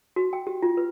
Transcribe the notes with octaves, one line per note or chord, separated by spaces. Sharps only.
F#4
G5
G4
F4
B4